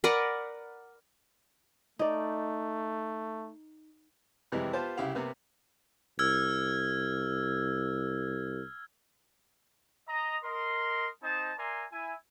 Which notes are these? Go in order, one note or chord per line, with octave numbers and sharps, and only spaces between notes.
A#4 B4 D5 F#5
A3 D#4 D5
F2 C3 E3 G3 G#3
B3 F4 G4 C5 A5
C2 C#3 E4 G4 F5 F#5
C3 A#3 B3
C2 E6 F6 G#6
D#5 A#5
A#4 D#5 C6
C4 D#4 C5 D#5 A5
A#4 D5 E5 G#5 A#5 C6
E4 G#5